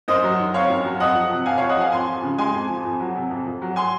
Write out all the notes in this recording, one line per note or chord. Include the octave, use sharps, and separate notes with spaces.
F#2 C5 D#5
F#3
D#3
C4 C#5 F5
F#2
F#3
F2 D#5 F#5
F3
C3
F2 F5 G#5
F2 C#5 F5
D#5 F#5
F3 F5 G#5
F2 G#5 C6
F3
C#3
G#3 G#5 C6
F2
F3
F2
F#3
C3
F2
F2
F#3
G#5 C6